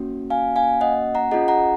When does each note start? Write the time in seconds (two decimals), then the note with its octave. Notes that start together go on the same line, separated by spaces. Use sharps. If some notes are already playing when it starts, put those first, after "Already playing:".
Already playing: A#3 C#4 F#4
0.30 F5 G#5
0.56 F5 G#5
0.81 D#5 F#5
1.15 F#5 A#5
1.31 C#4 F4 G#4 D#5 F#5
1.48 F#5 A#5